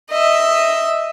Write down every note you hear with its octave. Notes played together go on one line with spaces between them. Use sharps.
D#5 E5